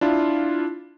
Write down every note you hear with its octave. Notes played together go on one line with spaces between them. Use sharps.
D4 E4 F4